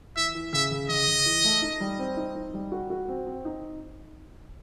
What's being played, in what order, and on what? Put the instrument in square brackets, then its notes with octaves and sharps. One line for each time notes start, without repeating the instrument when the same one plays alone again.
[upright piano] E3 [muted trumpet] E5
[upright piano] E3
[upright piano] C#3 [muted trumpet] E5
[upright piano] C#3
[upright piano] C#3 [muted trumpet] D#5
[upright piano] C#3
E3
A3
D#4
G3
C4
D#4
D#4
G3
F#4
F#4
C4
C4
D#4